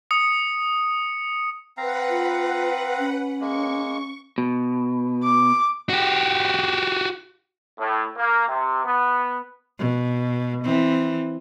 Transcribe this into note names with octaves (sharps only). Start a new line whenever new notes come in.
D#6 C#7
C4 B4 F5 F#5 A#5
F4
C#4
G#3 A#3 C#6
B2
D6
F#4 G4
A2
A#3
C3
B3
B2
E3 C4